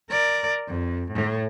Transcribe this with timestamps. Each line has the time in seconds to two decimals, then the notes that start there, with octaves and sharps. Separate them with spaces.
0.10 A#4 D5
0.67 F2
1.11 A2